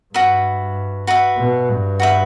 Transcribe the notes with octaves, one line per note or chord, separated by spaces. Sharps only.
G2 F#4 B4 E5
F#4 B4 E5
B2
G2
F#4 B4 E5